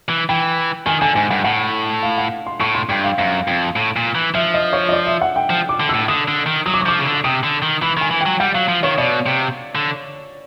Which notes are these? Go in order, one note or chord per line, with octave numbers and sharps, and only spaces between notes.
E3
E3 G5
D#3 G#5
D3 G#5
G#2 G#5
G2 F#5
A2 F#5
F5
F#5
C6
A2 C#6
C6
G2 G5
F5
F#2 F5
F2
A2
A#2
E3
F3 E5
D#5
C#5
D#5
D5
E5
F#5
G5
F3
D6
D3
E6
A2
D3 D#6
D3
D#3
F#3 D#6
D6
C#6
F3 D6
C#3
D3
C3 D#6
D3
D#3
E3 B5
D#3 G#5
E3
G5
F#3
G3 F#5
F#3 F5
F3
D#3 C#5
B2 D5
C3
D3